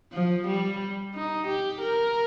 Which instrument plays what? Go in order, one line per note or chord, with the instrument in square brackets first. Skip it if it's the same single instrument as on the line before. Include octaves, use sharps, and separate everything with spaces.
[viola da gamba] F3
G3
D#4
G4
A#4